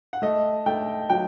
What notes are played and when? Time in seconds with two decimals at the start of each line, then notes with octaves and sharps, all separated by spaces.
0.13 F#5
0.22 A3 D#5
0.66 A3 G5
1.10 F#3 G5